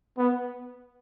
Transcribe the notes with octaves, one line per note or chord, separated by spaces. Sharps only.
B3